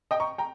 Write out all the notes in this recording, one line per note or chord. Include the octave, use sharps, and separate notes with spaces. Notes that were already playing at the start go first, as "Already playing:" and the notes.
D#5 G5
A#5 C#6
G5 A#5